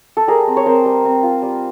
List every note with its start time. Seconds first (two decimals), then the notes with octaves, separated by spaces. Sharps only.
0.17 A4
0.27 G3 G#4 A#4
0.47 C4
0.57 C#5
0.66 C4 A#4 C5
0.85 G3
1.05 C4
1.23 F4
1.42 G3